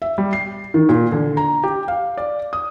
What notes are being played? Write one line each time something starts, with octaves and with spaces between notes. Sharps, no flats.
E5
G3
C7
D#3
A#2
D3
A#5
G4
F5
D5
D#6